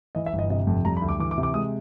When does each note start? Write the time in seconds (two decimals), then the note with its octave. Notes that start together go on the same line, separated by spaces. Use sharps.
0.15 E3 D#5
0.26 E5
0.33 G1
0.39 D#5
0.50 C3 D#5
0.67 F2
0.85 G3 A#5
0.97 B5
1.02 D2
1.09 D6
1.19 E3 D6
1.31 D6
1.38 C3
1.43 D6
1.54 G#3 D#6